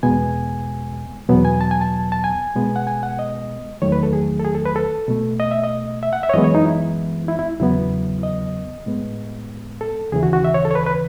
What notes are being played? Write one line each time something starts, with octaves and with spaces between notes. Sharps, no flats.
E2 B2 G#3 B3 G#5
E2 B2 F#3 B3
G#5
A5
G#5
A5
A5
G#5
B2 G#3 B3
F#5
G#5
F#5
D#5
E2 D#3 F#3 A3 C#5
B4
A4
G#4
A4
G#4
A4
B4
A4
B2 A3
D#5
E5
D#5
E5
F#5
E5
C#5
F#2 E3 G#3 B3 D#5
C#5
D#4
E4
E4
E4
E2 C#3 F#3 B3 E4
D#5
A2 G#3 B3
A4
D#2 C#3 E3 G#4
F#4
F#4
E5
C#5
A4
C#5
B4
B4